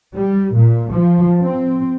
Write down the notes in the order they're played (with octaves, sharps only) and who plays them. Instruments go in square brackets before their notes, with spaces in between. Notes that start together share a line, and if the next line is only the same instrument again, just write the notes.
[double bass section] G3
A#2
F3
C4